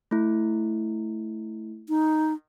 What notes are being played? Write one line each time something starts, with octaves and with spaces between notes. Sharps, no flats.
A3 E4
D#4